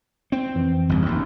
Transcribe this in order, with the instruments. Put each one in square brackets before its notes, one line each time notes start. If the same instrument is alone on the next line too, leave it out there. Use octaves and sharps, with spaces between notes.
[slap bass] C4
[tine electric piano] F2 E3
[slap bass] G1 C2
A1 D#2